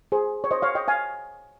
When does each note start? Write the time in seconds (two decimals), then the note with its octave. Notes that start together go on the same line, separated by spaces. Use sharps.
0.12 G#4 C5
0.44 C#5
0.51 C5 D#5
0.62 C#5 F5
0.75 D#5 G5
0.88 F5 G#5